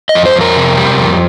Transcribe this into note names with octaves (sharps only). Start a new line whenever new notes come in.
D#5
F2
C5
F2
A#4
C3
G3
F2